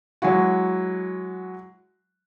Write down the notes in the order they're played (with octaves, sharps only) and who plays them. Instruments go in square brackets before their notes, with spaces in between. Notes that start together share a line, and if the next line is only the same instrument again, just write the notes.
[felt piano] F#3 G#3 E4 F#4